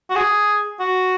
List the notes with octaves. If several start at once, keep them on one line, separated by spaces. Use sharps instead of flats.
F#4
G#4
F#4